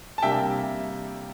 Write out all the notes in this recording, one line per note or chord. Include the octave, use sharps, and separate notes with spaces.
A5
C3 G3 A#3 D4 E5 G5